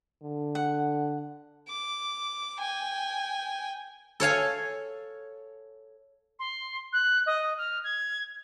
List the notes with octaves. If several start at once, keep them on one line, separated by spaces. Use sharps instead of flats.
D3
F#5
D6
G5 G#5
A4 C#5 F5 G#5
C6
F#6
D#5
F6
G#6